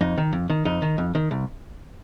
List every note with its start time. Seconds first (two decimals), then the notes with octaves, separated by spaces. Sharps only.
0.01 F2 D#4
0.18 D#3
0.33 F2
0.50 D#3
0.65 F2 D#4
0.82 D#3
0.98 F2
1.15 D#3
1.31 C2